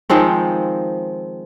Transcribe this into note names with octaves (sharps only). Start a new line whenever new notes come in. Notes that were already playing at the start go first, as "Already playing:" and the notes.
D#3 F3 G#3 C4